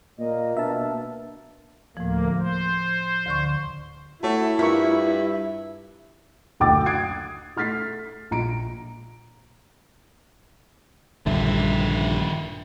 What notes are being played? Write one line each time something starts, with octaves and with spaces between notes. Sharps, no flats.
A#2 A#3 D#5
B2 D4 E5 A5
D2 A2 F3 A#3
C5
D2 D3 C#6
A3 E4 F#4 C#5
G2 F4 A#4 E5 C#6
F#1 D2 G5 D6 E6 A6
D#6 F#6 G#6 A6 C7 D7
A3 F6 A6 B6 C7
A#1 A#5 D7
A#1 G2 D3 D#3 E5